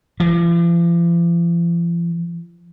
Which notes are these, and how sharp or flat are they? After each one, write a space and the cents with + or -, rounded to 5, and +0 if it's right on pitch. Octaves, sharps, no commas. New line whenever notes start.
F3 -45